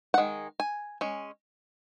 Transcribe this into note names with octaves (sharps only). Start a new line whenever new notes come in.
F#5
D#3 G#3
G#5
G#3 C#4